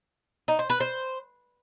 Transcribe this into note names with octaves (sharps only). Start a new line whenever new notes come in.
D#4
C5
B4
C5